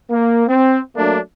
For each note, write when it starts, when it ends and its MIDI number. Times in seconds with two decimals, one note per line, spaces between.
0.10 0.47 58
0.48 0.78 60
0.96 1.19 54
0.96 1.19 57
0.96 1.19 58
0.96 1.19 62